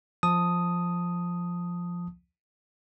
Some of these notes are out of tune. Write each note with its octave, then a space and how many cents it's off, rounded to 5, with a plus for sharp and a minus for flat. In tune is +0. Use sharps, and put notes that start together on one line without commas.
F3 +0 A5 +0 D#6 +0